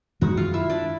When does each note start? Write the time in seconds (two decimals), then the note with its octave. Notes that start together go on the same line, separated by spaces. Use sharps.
0.21 F#2 D#3 G#3 F#4 F#5
0.37 F4 F5
0.54 E4 E5
0.70 D4 D5